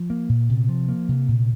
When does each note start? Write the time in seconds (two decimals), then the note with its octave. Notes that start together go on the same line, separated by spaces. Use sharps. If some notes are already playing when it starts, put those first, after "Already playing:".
Already playing: F3
0.10 A#3
0.29 A#2
0.49 C3
0.69 F3
0.89 A#3
1.09 C3
1.29 A#2